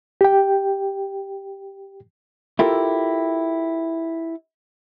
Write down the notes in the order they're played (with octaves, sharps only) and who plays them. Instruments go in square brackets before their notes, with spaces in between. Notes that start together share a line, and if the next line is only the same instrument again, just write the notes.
[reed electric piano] G4 G5
[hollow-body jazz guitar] E4 F4 G4 A4 A#4